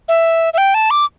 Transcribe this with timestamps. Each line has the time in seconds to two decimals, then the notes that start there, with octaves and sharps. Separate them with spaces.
0.08 E5
0.53 E5
0.58 G5
0.74 A5
0.90 D6